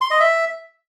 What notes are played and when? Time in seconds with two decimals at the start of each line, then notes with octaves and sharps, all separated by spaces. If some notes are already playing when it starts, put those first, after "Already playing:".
0.01 C6
0.11 D#5
0.20 E5